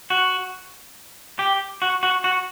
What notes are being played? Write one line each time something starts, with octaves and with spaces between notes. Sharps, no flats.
F#4
G4
F#4
F#4
F#4